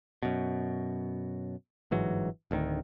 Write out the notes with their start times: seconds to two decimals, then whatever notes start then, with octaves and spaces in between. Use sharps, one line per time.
0.23 F#2 B2
1.91 G1 G#2 E3 F#3
2.51 D1 D2 D3 D#3